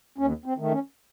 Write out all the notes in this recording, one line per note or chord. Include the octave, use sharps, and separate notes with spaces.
D#2 C#4
C4
D#3 A3
C#4